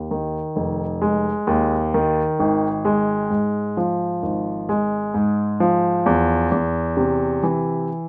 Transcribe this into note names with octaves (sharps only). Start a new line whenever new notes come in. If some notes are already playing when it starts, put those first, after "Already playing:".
Already playing: D#2
D#3
F1
G#3
D#2
D#3
G#1
G#3
G#2
F3
G#1
G#3
G#2
F3
E2
E2
C3
E3